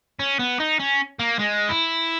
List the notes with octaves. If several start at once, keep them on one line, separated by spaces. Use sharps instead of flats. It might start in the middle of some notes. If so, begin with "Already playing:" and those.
C#4
B3
D#4
C#4
A#3
G#3
E4